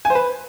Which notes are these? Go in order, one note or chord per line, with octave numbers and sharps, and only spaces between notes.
G#5
C5
B4